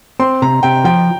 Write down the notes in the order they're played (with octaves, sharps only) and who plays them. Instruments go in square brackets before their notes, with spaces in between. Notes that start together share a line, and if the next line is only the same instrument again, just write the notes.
[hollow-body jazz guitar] C4 [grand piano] C6
[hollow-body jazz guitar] C3 [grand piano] A#5
[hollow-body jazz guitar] C3 [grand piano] G5
[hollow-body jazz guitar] F3 [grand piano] G5